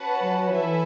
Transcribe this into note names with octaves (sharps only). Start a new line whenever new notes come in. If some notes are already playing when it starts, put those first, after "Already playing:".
Already playing: C#4 F#4 B4 F#5 A5
F#3
E3 E4 A4 E5 G#5